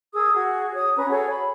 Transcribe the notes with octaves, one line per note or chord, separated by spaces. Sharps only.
G#4 A#4 D#6 E6
F#4 G#4
C#5 D#6
C#4 B4 A#5
F#4 G#4 A4 C#5
B5